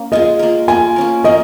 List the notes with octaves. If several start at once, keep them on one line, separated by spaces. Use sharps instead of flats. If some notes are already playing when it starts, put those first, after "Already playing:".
Already playing: A#3 C#4
G#3 F4 G#4 D#5
A#3 F4 A#4
A#3 F4 A#4 G#5
A#3 C#4 A#4
A#3 C#4 A#4 D#5